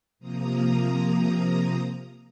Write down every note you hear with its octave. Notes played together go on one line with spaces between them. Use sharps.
C3 F3 A#3 A#5 D#6